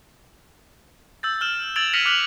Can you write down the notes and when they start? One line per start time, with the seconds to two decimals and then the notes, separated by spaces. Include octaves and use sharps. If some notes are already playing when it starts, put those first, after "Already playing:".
1.23 E6 G6 A6
1.41 F6 E7
1.76 E6 G#6 A6 D7 F7 F#7
1.93 F6 A#6 B6 C#7 D#7 F7
2.05 D6 F6 F#6 F7 F#7